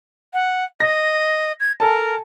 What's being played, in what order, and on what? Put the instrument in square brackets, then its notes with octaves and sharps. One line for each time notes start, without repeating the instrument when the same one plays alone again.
[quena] F#5
[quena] D#5 [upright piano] A#6
[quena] G#6
[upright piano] A4 G#5 A5 [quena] A#4